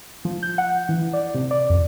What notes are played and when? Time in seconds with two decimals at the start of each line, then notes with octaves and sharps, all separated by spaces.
0.25 F3
0.43 G6
0.58 F#5
0.89 E3
1.13 D5
1.34 C3
1.51 D5
1.70 F2